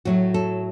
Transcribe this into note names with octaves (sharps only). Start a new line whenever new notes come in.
A2 F#3 A3 F#4
A4